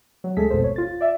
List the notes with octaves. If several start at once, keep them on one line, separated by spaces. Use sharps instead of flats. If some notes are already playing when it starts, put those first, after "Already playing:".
F#3
D2 G#3 A3 G#4 A4 B6
G#1 F2 B2 A4 C5
C#5
F4 A6
D5 E5